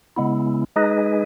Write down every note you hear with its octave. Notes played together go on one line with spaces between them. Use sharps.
C#3 G#3 B3 E4
G#3 D#4 G#4 B4 D#5